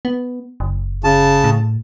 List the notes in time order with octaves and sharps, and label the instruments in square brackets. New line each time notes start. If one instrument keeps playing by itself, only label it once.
[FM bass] B3
F#1
[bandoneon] C#3 A5
[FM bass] A2